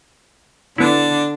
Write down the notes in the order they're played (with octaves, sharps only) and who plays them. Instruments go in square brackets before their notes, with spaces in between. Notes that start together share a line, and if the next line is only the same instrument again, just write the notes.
[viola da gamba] D3 [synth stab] B3 E4 [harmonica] D4